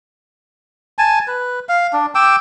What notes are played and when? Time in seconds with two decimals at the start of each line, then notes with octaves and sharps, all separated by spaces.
0.99 G#5 A5
1.28 B4
1.69 F5
1.93 D4
2.15 G5 D6 E6